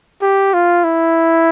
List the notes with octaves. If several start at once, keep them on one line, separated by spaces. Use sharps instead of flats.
G4
F4
E4